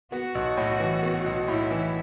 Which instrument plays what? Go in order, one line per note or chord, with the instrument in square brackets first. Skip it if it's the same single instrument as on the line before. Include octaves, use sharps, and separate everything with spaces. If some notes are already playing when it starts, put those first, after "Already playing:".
[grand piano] B3 [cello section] F#4
[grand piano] B1
A2
E3
B3
B1
[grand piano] A2 [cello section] E4
[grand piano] E3